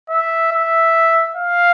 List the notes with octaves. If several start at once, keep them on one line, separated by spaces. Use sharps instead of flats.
E5
E5
F5